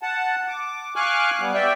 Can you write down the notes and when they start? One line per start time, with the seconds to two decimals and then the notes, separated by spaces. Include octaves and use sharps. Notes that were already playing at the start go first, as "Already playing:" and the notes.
0.02 F#5 A5
0.48 D6
0.96 F5 G#5 C#6 D6 F6 F#6
1.39 G3 B3
1.54 D5 E5 G5